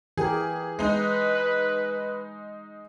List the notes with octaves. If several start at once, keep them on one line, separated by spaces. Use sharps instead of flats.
E3 G4 G#4 A#4
G#3 D#4 B4